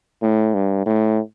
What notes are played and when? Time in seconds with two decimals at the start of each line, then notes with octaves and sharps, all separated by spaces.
0.22 A2
0.54 G2
0.86 A2